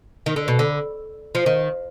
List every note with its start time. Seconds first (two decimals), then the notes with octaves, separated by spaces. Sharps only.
0.26 D#3
0.36 D3
0.48 B2
0.59 D3
1.35 F3
1.46 D#3